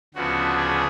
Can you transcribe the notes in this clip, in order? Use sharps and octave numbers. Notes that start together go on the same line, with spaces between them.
D2 C#3 F3 B3 D4 F#4
G#4